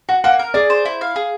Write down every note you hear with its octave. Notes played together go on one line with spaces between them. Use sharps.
F#4 F#5
A#3 F#5
A#4
G#4 D5
C5
E4
F5
G#4